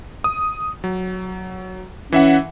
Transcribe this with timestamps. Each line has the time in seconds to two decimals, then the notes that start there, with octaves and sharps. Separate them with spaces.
0.24 D#6
0.84 F#3
2.12 E3 C#4 E5 F#5